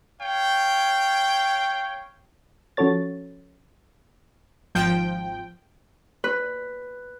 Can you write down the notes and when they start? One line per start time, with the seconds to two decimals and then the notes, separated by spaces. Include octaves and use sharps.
0.21 C#5 F5 G5
2.77 F3 C#4 F#4 A4 C#5 A6
4.75 G#1 F3 G5
6.24 B4